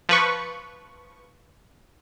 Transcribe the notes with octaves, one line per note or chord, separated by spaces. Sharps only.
F3 B4 C#6